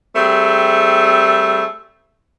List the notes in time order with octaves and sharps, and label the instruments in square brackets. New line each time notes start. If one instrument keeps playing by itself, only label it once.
[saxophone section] G3 A3 C4 G#4